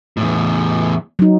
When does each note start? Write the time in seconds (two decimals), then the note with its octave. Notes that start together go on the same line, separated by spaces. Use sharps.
0.17 E2 A2
1.19 F#3 D#4